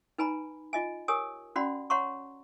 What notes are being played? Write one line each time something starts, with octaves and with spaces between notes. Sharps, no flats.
D#4 B4 G#5 A#5 B5
F4 D#5 G#5
G4 A#4 C#5 G#5 D#6
C#4 F#4 D5 F#5 B5 C6
C#5 F#5 A#5 C6 C#6